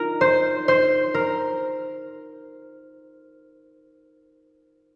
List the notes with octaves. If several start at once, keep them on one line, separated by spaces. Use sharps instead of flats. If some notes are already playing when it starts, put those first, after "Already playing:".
Already playing: D#4 F4 A#4
C5
C5
A#4